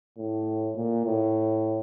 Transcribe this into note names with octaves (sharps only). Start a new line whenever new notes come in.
A2
A#2
A2